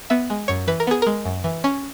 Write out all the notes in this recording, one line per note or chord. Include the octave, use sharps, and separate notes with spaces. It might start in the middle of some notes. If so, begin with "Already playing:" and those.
B3 E5
G#3
F#2 C#5
E3 B4
A#4
B3 G#4
G#3 A#4
F#2
E3
C#4